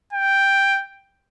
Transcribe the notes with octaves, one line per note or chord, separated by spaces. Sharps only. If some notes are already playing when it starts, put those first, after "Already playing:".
G5